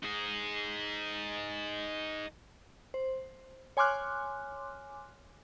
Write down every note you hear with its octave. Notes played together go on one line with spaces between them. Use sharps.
D#4 G#4
C5
C#5 G#5 C6 D6 F6 F#6